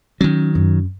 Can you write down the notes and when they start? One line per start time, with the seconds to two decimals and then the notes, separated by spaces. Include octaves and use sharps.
0.21 D#3 F#3 C#4
0.55 F#2